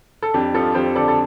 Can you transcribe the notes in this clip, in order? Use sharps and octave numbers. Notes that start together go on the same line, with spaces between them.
A4
F2 D4 G4
F3 F4 A4
F2 G4 C5
D3 A4 D5
A4